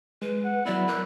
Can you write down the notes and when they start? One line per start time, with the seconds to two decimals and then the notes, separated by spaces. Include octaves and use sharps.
0.22 G#3 B4
0.45 F#5
0.66 F#3 B3 E4 D5
0.88 A#4 D5 F#6